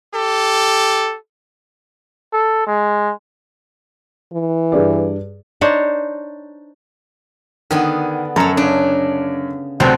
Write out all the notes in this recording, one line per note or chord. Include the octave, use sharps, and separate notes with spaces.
G4 A4
A4
G#3
E3
G2 G#4 D5
D4 D#4 C5 C#5
D3 D#3 B3 G#4
F#2 A4 C#5 A#5
C#3 D4
D2 C3 F#3 B3 C4 F#4 A5